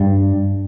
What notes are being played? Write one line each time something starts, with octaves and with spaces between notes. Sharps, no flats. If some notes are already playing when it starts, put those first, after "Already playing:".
Already playing: G2